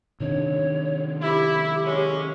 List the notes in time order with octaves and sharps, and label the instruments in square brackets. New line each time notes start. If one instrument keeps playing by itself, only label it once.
[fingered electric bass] C3 D#3 D4 [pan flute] C#5
[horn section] E4 [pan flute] G4
[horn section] G#3 C#4